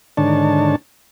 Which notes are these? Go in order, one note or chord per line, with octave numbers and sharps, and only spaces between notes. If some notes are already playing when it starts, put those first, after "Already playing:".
G#2 D3 D#3 D4 C#5 A5